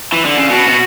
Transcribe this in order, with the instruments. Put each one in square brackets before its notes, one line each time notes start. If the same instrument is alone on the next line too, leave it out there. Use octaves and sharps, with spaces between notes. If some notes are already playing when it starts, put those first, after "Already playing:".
[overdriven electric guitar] E3
D3
C#3
[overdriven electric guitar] B2 [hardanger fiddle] F#4
[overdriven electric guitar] B2